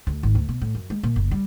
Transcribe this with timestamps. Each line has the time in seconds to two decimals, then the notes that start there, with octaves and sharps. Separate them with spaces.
0.07 D2
0.23 G#1
0.35 D2
0.49 B2
0.62 A2
0.75 F#2
0.90 G#3
1.03 A#2
1.16 F#1
1.31 G3